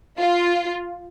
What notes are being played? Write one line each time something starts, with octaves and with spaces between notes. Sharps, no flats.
F4